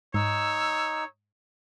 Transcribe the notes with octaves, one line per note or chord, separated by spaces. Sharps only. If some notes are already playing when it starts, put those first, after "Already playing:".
G#2 D#4 C#5 E6